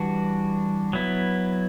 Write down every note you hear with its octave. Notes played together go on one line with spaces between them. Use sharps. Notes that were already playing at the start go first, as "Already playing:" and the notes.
Already playing: E3 G3 D4 F#4
F#3 B3 E4